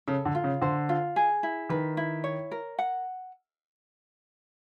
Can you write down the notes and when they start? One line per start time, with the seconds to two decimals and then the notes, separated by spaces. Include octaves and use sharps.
0.08 C#3 A4
0.25 D3
0.35 F4
0.44 C#3
0.62 D3 C5
0.89 F4
1.16 G#4
1.43 E4
1.69 D#3 B4
1.97 E4
2.24 C#5
2.51 A#4
2.79 F#5